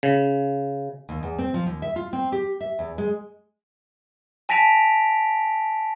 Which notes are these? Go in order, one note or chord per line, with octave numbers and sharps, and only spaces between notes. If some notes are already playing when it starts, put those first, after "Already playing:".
C#3
D#2
E2
C4
F3
D#2
E5
F4
C4
G4
E5
E2
G#3
G#5 A5 A#6 B6 D7 F7